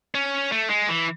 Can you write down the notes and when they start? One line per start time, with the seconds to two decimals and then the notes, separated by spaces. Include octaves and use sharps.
0.15 C#4
0.52 A3
0.70 G#3
0.88 E3